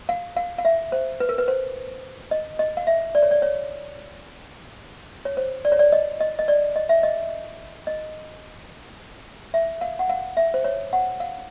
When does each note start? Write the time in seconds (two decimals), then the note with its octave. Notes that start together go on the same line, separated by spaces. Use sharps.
0.09 F5
0.37 F5
0.58 F5
0.65 E5
0.92 C5
1.20 B4
1.29 A#4
1.38 B4
1.48 C5
2.31 D#5
2.59 D#5
2.77 F5
2.87 E5
3.15 D5
3.23 C#5
3.31 D5
3.42 C#5
5.25 C#5
5.37 C5
5.65 D5
5.72 C#5
5.79 D5
5.92 D#5
6.20 D#5
6.39 D#5
6.48 D5
6.76 D#5
6.89 E5
7.03 D#5
7.87 D#5
9.54 E5
9.81 F5
9.99 F#5
10.09 F5
10.37 E5
10.54 C5
10.64 C#5
10.93 F#5
11.20 F5